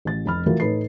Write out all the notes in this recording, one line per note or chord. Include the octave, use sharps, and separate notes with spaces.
A1 A6
F1 B5 F6
E3 F3 A3 E4 F#4 A#4
A2 D#4 A4 B4 C7